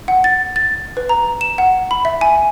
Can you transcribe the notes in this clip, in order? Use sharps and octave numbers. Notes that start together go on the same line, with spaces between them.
F#5
A6
A6
B4
A#5
E7
F#5
B5
E5
G#5